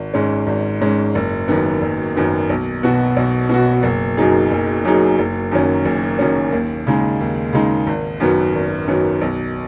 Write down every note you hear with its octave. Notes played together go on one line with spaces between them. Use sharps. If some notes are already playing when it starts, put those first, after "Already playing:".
Already playing: G#1
G#2 G#3 C#4
G#1
G#2 G#3 C#4
F#1
F#2 D#3 B3
F#1
F#2 D#3 B3
B1
B2 B3 F#4
B1
B2 B3 F#4
F#1
F#2 F#3 D#4 G#4
F#1
F#2 F#3 D#4 G#4
F#1
F#2 D#3 F#3 C#4
F#1
F#2 D#3 F#3 C#4
D#2
C#3 G#3 D#4 G#4
D#2
C#3 G#3 D#4 G#4
G#1
F#2 D#3 F#3 B3
G#1
F#2 D#3 F#3 B3
B1